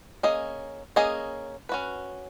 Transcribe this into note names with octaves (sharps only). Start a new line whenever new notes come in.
A#3 C#4 G#4 D#5
A#3 C#4 G#4 D#5
C#4 F#4 B4